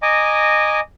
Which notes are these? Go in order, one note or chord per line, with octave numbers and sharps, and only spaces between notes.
D#5 G#5 A#5 D6